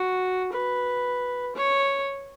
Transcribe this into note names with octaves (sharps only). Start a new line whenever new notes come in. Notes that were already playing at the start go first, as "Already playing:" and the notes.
Already playing: F#4
B4
C#5